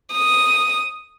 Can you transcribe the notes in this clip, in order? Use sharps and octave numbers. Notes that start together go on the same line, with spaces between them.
D#6